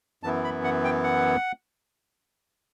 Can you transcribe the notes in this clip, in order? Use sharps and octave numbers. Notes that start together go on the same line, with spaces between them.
F#2 E3 B3 E4 A5
B5
F#5
G5
F#5